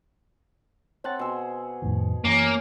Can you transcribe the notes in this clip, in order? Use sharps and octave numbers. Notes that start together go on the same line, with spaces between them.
C4 A4 C#5 F#5 F#6 A6
B2 G#4 C6 E6
F2 A2 D#3
F#2 E3 A#3 C#4